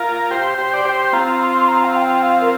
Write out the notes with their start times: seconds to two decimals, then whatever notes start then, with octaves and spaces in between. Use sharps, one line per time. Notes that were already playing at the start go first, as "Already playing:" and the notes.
Already playing: F4 A#4
0.31 G4 C5
0.58 G4 C5
0.74 D5
0.85 G4 C5
1.06 C6
1.13 C4 F4 A#5
1.40 C6
1.68 A#5
1.84 F5
1.95 G5
2.22 F5
2.41 A#4